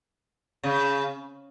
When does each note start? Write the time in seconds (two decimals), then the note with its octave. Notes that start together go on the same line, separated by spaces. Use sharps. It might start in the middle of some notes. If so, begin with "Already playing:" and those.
0.63 C#3